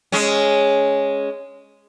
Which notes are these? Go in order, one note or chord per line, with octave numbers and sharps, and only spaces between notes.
G#3 C#4